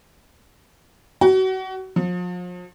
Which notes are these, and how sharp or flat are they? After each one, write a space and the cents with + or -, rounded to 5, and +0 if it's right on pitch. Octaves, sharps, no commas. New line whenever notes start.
F#4 +30
F3 +40